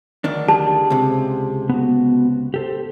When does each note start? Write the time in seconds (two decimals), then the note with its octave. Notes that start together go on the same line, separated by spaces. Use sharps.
0.24 D2 D#3 D4
0.48 G4 G#4 A5
0.90 C#2 C3
1.69 B3 F#4
2.54 G4 A4 C5